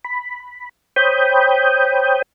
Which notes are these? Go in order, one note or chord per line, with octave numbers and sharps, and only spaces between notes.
B5
C5 C#5 G5 B5 D#6 G6